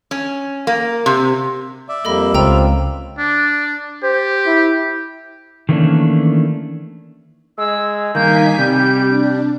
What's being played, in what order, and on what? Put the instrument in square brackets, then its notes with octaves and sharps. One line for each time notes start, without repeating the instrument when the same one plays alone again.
[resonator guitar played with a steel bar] C#4
A#3
C3
[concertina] D5 E5
[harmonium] F2 G3 A#3 [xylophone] A4 D#5 B5
[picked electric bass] C#2 [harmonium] C4 F4 [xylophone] G5 A#5 E6
[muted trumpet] D4
[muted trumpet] G4 [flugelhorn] C5
[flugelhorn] E4
[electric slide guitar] D#3 E3 A3 A#3 C#4 D4
[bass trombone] G#3 [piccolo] E6
[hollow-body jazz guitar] G2 D#3 [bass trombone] A#3 [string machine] D#4 G#5 B6 [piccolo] G6
[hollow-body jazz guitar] C3 [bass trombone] G3 [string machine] G4
[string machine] D4